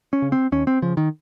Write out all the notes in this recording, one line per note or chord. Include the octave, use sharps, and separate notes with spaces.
C#4
C#3
C4
D#2 C#4
C4
C#3 F3
D#3